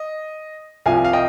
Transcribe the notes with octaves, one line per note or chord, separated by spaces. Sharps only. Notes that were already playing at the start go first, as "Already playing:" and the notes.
Already playing: D#5
C2 C3 F3 F5 G#5
F5
D#5 G5